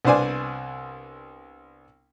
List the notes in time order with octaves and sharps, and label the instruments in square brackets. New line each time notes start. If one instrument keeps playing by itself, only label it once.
[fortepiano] C2 B3 D4 C5 D5 G#5